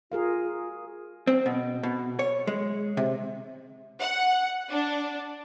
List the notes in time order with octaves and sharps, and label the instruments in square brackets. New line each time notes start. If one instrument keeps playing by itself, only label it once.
[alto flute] F4 [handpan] G#4 A#4 F5
[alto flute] F#4
[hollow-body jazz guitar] C4
B2
B2
C#5
G#3
C3
[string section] F#5
D4